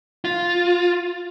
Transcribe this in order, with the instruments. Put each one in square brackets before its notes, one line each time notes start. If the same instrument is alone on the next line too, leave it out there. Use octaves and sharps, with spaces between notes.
[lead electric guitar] F4